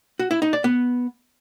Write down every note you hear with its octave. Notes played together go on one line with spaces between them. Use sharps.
F#4
E4
D#4
D5
B3